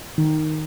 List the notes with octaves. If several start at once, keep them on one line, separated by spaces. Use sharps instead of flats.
D#3